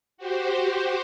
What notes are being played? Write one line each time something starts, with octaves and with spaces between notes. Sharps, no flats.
F#4 G4 C5